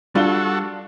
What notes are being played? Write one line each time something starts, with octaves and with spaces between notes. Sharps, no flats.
G3 D4 F4 F#4 A4 F5 G7